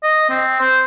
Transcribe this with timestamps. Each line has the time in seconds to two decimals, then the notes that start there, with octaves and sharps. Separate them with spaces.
0.03 D#5
0.30 C4
0.60 C5